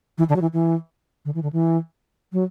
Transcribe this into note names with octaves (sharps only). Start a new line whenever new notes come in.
E3
D3
F#3
E3
E3
D3
E3
D3
E3
F#3